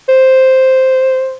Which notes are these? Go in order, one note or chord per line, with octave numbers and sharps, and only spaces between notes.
C5